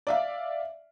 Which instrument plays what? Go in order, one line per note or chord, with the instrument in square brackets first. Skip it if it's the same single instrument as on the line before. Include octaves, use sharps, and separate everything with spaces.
[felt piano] D5 E5 F5